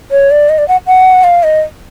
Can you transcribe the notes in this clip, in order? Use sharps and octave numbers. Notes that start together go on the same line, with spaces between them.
C#5
D5
D#5
D5
F#5
F#5
F5
D#5